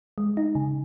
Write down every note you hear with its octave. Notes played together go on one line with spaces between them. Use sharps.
G#3
D#4
C#3